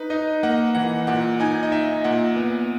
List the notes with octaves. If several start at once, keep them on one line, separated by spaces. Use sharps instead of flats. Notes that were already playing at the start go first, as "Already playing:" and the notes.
Already playing: D#4 B4
D#4 D#5
A#3 F#5
E3 F#5
A#2 F#5
D#4 G#5
D#5
D#4 E5
A#2 F#5
B3